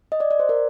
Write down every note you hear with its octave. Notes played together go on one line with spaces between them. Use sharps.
D#5
D5
D5
C5
A#4